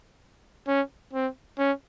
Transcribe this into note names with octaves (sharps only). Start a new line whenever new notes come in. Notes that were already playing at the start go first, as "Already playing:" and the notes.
C#4
C4
C#4